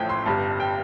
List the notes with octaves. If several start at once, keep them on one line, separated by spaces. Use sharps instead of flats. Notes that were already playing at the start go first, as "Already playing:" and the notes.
Already playing: A1 A2 F3 A3 G5
C6
G1 G2 G3 A5
G5